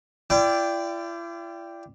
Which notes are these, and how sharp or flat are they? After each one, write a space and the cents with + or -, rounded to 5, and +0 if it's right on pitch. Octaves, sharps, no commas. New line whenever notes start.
E4 +45 D5 -5 G5 +0